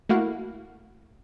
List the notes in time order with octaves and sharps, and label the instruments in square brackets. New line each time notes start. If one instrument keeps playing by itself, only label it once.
[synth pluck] A3 A#3 E4 F#4 F5 F#5